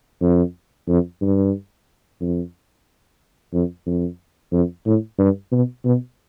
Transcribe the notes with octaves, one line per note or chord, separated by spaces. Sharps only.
F2
F2
G2
F2
F2
F2
F2
A2
G2
B2
B2